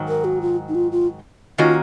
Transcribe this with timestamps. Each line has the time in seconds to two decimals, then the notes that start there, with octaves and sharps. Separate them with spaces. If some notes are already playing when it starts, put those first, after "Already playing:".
Already playing: G#2 D#3 F#3
0.08 A#4
0.24 F#4
0.41 F4
0.68 D#4
0.75 F4
0.92 F4
1.58 D#3 A#3 C#4 F4 F#4